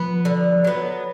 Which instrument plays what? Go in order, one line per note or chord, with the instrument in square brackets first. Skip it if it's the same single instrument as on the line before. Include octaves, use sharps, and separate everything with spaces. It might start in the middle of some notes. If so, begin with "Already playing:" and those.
Already playing: [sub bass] F3 [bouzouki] B3
[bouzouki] D3
F#3 B3